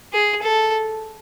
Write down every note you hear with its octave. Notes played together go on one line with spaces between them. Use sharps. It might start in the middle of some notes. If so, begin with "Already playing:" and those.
G#4
A4